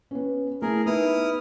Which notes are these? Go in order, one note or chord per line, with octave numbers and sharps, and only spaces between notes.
B3 C#4
A3 E4 G#4 A#4
B3 D#4 E4 D#6 F6